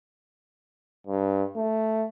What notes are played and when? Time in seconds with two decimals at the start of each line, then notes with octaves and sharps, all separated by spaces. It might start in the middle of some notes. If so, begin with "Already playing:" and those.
1.07 G2
1.57 A3